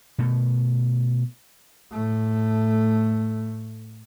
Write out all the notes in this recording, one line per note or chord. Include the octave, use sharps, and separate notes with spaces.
B2 A3
A2 A3